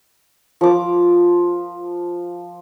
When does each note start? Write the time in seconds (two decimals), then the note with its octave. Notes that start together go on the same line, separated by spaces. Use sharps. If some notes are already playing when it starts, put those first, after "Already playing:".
0.61 F3 D6